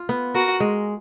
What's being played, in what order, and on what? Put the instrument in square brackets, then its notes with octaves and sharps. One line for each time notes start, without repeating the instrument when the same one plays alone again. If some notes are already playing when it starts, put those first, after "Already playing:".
Already playing: [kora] F4
B3
[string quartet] F#4 [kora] A#4
[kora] G#3